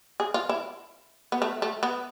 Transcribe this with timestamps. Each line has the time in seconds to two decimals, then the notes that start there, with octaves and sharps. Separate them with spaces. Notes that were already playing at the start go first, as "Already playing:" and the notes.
0.20 G#4
0.34 F4
0.49 E4
1.32 B3
1.42 A3
1.62 A3
1.83 B3